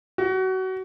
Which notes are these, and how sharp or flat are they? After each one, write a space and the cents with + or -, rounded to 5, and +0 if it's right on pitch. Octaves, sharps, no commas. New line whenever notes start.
F#4 +25